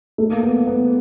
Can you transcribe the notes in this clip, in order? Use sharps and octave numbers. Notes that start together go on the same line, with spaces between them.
A3
A#3
B3
B3